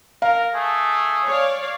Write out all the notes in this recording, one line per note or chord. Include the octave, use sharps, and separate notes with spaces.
A#4 F5
A3 G#4
C#5 D5 F5